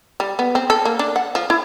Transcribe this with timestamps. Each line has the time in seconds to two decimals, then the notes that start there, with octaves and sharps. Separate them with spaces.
0.20 G3
0.39 B3
0.55 C4
0.70 A4
0.85 A#3
0.99 D4
1.16 F#5
1.35 F3
1.50 E4